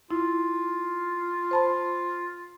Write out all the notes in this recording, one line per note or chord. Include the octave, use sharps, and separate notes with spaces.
E4 F4
C5 A5 B5